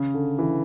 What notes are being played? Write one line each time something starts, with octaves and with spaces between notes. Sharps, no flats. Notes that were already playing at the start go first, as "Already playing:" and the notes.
Already playing: C#3
D3
E3